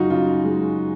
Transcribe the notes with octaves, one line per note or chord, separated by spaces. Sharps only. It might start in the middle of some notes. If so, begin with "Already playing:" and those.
Already playing: F#2 C#3 D#4 F4 F#4
C#3 F4
G#3